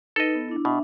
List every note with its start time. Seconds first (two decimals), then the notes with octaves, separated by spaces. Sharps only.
0.16 D#4 A4 B4 D#5
0.35 B3
0.48 D4 E4
0.65 B2 D4 E5